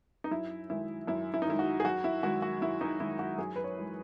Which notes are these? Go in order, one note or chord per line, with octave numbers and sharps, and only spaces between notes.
D#4
F#2 E4
D#3 G#3 E4
F#2 E4
E4
D#4
D#3 G#3 E4
F#4
G#4
F#2 F#4
E4
D#3 G#3 F#4
F#4
F#2 E4
D#4
D#3 G#3 E4
F#4
F#2 G#4
B4
C#5
E3 G#3